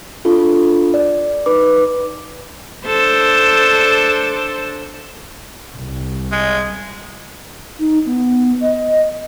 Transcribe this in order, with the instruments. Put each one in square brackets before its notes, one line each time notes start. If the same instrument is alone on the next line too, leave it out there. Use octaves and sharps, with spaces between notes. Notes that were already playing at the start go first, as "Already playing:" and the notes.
[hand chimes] D4 F4 A4
D5
D#4 B4 D6
[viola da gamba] D4 A4 C5
[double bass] C2
[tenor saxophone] G#3
[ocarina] D#4
B3
D#5